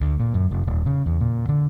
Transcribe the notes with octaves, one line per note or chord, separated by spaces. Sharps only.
D2
A#2
F#2
F1
D#1
C#3
E2
A#2
D3